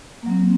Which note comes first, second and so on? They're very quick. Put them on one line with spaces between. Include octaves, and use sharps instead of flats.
A#3 F#3 C4